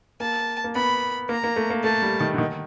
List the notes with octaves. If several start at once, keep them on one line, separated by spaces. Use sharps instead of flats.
A#3 A5
A#3
B3 B5
A#3 A#5
A#3
A3
A#3
A3 A5
G3
D#3
D3
D#3